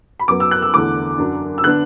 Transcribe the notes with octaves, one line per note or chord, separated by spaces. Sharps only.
B5
F#2 F#3 B3 D6
E6
F#6
E6
E2 D3 A3 D4 D6
F#2 F#3 D4
E6
D3 B3 D4 F#6